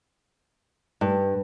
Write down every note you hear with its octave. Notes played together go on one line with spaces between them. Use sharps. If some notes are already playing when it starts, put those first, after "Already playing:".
G2